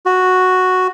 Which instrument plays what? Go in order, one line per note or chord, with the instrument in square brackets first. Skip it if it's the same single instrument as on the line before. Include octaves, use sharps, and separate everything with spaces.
[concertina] F#4